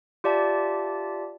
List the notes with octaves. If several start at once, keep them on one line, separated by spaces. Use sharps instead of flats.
F4 G4 D5 E5 A5